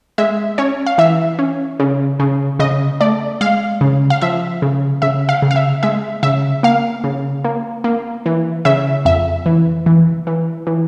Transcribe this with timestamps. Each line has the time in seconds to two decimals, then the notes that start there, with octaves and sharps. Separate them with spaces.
0.18 G#3 E5
0.58 C#4 C#5
0.86 F5
0.98 E3 E5
1.39 C#4
1.80 C#3
2.20 C#3
2.59 C#3 D#5
3.01 A3 D5
3.41 G#3 F5
3.81 C#3
4.10 F5
4.21 F3 E5
4.62 C#3
5.02 C#3 E5
5.29 F5
5.42 C#3
5.51 F5
5.56 E5
5.83 G#3 E5
6.23 C#3 E5
6.63 A#3 F5
7.04 C#3
7.45 A#3
7.84 A#3
8.26 E3
8.65 C#3 E5
9.05 F2 E5
9.46 E3
9.86 E3
10.27 E3
10.67 E3